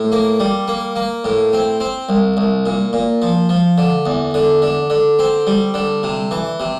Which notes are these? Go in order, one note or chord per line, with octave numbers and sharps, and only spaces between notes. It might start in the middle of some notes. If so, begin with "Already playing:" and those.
Already playing: A2
A#3
G3
A#3
A#3
A2
C4
C4
C2
C2
A#2
A#2
F3
F3
D3
E2
D3
D3
D3
C4
G3
D3
C3
E3
C3